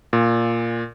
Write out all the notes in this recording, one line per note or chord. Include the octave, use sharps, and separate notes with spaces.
A#2